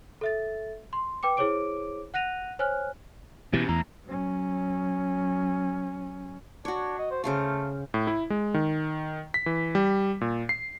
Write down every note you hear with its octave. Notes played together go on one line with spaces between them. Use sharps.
A4 E5 A6
C6
B4 G5 D6 C#7
E4 G#4 C5 C#5 D6 D7
F#5 F#6 A#6 D#7 F7
C5 C#5 G#5 F6 F#6
B2 E3 C#4 G4
E2 A3 A#5
F#3 C#4
D4 F#4 C#5
D#5
C5
C#3 A3 C5 F5
A2
E4
G#3
D#3
B6
E3
G3
A#2
C7